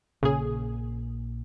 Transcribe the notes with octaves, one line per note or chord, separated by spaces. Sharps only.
A#1 A#2 C#3 A#3 G#4